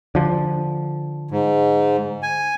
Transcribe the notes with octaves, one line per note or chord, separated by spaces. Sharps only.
D3 F3
G#2
G#5